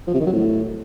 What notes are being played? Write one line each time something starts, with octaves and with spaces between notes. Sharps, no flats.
F3
C3
D#3
F#3
A2